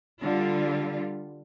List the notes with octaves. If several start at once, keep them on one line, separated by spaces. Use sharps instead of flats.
D3 G3 F4